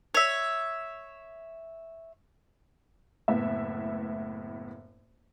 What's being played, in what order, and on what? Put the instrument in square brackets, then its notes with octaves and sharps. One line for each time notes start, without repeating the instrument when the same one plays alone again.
[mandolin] C#5 E5
[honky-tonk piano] F#1 A2 B3 E5